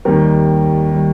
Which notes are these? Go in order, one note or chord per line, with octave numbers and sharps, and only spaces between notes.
D#2 D#3 G3 A#4
D#3 G3